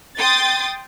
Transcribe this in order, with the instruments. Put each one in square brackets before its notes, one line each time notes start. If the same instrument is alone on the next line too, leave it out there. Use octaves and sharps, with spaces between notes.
[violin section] G5 C6 D#6 A6